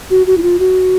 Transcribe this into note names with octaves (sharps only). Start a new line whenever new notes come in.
F#4
F#4
E4
F4
F#4